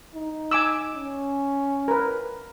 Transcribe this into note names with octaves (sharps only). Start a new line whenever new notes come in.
D#4
G#5 D6 E6
C#4
A#4 B4